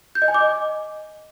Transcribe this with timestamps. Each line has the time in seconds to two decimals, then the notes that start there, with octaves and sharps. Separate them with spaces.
0.15 G6
0.22 D#5
0.28 G#5
0.34 D6
0.41 D#5